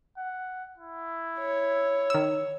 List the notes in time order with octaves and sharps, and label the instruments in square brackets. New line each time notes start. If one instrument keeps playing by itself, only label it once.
[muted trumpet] F#5
E4
[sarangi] C#5
[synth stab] D#3 E6